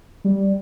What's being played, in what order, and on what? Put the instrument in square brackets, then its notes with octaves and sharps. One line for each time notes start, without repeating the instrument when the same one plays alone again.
[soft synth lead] G3